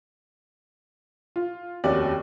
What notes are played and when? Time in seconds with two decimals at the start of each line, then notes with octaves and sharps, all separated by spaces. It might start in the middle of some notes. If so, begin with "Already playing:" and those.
1.36 F4
1.84 F1 D#2 C#4 F#4 D5